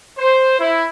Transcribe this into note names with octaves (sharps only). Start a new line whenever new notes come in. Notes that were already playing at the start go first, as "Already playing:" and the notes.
C5
E4